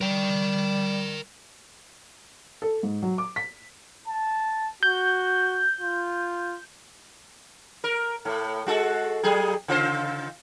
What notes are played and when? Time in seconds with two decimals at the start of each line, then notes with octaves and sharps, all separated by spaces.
0.01 G3 A#4 G5
2.62 A4
2.83 G#2
3.02 F#3
3.18 D6
3.36 B6
4.08 A5
4.83 F#4 G6
5.81 F4
7.84 A#4
8.25 A2 A3
8.67 G#3 F#4 A4
9.23 F#3 G3 G#4
9.68 C#3 F4 C5